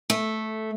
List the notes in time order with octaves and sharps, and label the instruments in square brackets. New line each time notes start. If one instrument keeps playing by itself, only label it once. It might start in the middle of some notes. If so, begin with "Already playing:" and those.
[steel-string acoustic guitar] A3